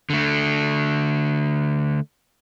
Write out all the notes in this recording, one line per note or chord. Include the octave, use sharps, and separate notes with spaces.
D3 A3